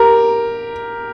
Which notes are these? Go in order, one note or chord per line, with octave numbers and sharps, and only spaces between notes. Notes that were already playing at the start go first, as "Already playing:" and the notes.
Already playing: G4 A#4